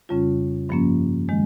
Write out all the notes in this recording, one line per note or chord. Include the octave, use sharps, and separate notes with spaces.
F2 C#3 G3 C#4 F4
G2 F3 A#3 C#4
D#3 G#3